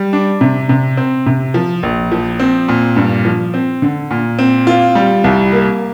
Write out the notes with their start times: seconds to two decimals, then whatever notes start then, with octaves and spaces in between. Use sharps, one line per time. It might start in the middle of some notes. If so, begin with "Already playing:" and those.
Already playing: G3
0.13 D4
0.41 C3
0.69 C3
0.97 C4
1.26 C3
1.54 F3
1.83 A#1
2.12 F3
2.40 C4
2.69 A#2
2.96 G2
3.25 F3
3.54 C4
3.82 D3
4.11 A#2
4.39 C4
4.67 F4
4.95 G3
5.24 C2
5.52 A#3